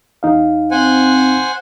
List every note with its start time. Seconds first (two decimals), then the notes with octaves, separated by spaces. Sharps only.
0.23 E2 D#4 F5
0.71 C4 C5 F#5 G#5